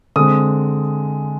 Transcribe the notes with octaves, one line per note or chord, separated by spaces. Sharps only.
D3 G#3 C4 D#6